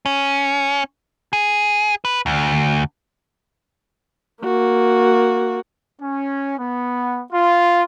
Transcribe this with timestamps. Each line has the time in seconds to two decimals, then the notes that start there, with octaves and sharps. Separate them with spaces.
0.06 C#4
1.33 G#4
2.05 B4
2.26 D2
4.43 A#3 F#4
6.02 C#4
6.59 B3
7.33 F4